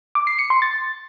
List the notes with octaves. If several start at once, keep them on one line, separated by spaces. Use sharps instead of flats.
D6
C7
C#7
C6
A6